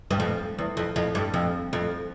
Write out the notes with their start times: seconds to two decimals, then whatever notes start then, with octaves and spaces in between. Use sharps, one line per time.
0.11 G2
0.20 F2
0.59 E2
0.77 F2
0.96 F2
1.15 G2
1.34 F2
1.73 F2